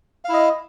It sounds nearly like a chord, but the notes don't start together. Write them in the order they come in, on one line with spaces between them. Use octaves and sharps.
F5 E4 D#5